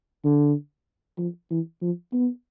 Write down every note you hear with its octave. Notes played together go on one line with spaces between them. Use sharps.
D3
F3
E3
F3
B3